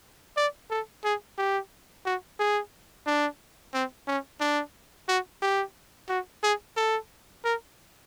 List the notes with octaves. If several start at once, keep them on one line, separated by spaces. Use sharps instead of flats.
D5
A4
G#4
G4
F#4
G#4
D4
C4
C#4
D4
F#4
G4
F#4
G#4
A4
A#4